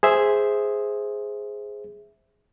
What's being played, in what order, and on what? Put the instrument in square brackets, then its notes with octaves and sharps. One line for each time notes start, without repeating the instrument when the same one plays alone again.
[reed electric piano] G#4 C5 E5